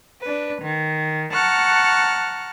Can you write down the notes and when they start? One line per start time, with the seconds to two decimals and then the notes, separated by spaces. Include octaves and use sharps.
0.22 D4 B4
0.62 D#3
1.33 F#5 A5 A#5 C#6 F6 F#6